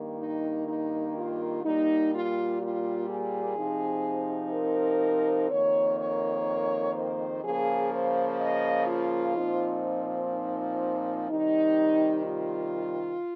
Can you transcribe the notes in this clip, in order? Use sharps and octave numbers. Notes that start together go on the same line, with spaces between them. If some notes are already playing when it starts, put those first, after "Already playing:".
Already playing: G2 D#3 A#3
D#4
D#4
F4
A#2 G3 A#3 D#4
F4
F4
G#4
C3 F3 C4 D#4
A#4
F2 D#3 A#3 C#5
C#5
C5
C#3 F3 A#3 G#4
C5
D#5
F4
A#2 F3 C4 D#4
D#4
C3 D#3 G3 D#4
F4